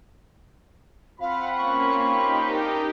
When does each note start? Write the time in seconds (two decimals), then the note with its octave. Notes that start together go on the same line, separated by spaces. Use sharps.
1.20 C4 F4 F5 F#5 B5
1.57 A#3 C#4 C#6
2.03 D#4 G4
2.50 D4 A#4